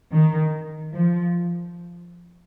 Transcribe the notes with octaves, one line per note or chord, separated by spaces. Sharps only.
D#3
F3